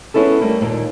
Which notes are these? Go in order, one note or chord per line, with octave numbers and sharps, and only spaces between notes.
B3 C#4 E4 G#4 A4
G3 A3 A#3
D#2 A#2